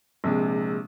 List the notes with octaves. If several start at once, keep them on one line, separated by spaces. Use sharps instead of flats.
A#1 C3 G#3